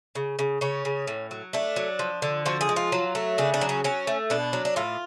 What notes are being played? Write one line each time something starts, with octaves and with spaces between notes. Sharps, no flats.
C#3
C#3
C#3 C#4
C#3
A2
F#3
A3 D4
F#3
F3
D3
F3 F#4
G#4
G#3
F4
F#3
A3
C#3 D4
D4
F#3
C#4
F#3 C#4
A3
B2 D4
F#3
D4
A2 F4